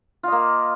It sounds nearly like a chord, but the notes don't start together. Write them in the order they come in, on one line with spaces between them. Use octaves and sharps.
F4 D#5 A#3